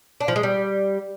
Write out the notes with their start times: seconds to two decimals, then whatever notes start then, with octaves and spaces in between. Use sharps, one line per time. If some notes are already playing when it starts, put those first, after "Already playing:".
0.21 D4
0.28 F3
0.36 G#3
0.43 G3